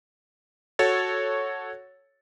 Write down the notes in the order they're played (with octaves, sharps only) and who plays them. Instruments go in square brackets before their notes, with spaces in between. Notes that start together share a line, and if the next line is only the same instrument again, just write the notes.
[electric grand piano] F#4 A4 C#5 A6